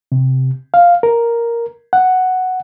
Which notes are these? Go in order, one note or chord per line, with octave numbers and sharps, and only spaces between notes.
C3
F5
A#4
F#5